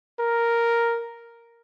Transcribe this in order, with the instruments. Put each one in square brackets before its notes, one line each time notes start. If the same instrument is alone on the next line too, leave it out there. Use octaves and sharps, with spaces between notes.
[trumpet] A#4